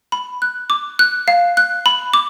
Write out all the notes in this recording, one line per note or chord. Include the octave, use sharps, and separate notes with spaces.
B5
F#6
D6
F#6
F5
F#6
B5
D6